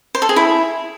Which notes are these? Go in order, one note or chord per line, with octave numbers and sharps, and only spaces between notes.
C5
A4
G#4
E4